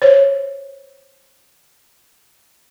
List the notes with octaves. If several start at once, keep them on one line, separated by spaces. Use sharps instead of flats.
C5 C#5